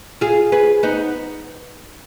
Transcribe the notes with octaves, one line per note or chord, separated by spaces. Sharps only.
F4 G#4
G#4 B4
B3 D#4